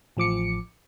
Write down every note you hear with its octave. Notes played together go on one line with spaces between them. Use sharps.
A1 F3 D6 C#7